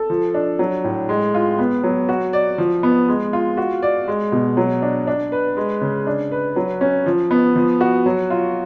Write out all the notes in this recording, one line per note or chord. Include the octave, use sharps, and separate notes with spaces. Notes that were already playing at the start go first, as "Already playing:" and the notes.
Already playing: A4
F3
D4
F#3
A2
G#3
F4
B3
F#3
F#4
D5
F3
B3
G#3
F4
F#4
D5
G#3
B2
F#3
D4
D4
B4
G#3
C#3
D4
B4
F#3
C#4
F3
B3
F3
F#4
F#3
F4